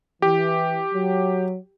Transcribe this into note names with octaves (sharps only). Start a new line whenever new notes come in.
E3 G4
F#3